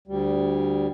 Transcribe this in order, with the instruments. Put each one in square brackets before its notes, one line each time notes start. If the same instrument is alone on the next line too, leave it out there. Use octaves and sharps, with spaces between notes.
[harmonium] D2 G3